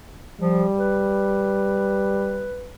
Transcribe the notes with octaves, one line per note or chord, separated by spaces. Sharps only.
F3 G3
B4